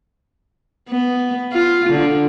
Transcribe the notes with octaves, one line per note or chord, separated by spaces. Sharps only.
B3
F4
D3